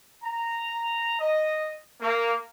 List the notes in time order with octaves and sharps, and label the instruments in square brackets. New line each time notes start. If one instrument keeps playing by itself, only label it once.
[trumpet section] A#5
D#5
A#3